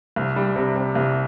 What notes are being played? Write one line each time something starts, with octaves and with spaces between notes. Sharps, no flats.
C2
G3
C3
C3
C2